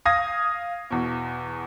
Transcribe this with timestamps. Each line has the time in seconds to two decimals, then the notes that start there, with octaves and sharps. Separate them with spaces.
0.05 F5 D#6 G#6 A#6
0.91 E2 B2